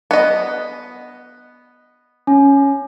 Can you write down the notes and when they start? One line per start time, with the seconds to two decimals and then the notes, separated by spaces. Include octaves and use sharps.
0.11 B3 D#5
2.27 C#4